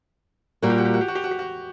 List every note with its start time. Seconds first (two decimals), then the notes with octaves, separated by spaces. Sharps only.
0.62 A#2 G3 A#3 F#4
0.70 G4
0.78 F#4
0.85 G4
0.94 F#4
1.01 G4
1.08 F#4
1.15 G4
1.24 F#4
1.31 G4
1.39 F#4